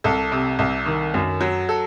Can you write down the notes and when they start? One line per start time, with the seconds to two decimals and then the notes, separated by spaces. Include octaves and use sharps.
0.04 C2 A4
0.32 C3
0.59 C2
0.86 D#3
1.14 F#2
1.41 F#3
1.69 A4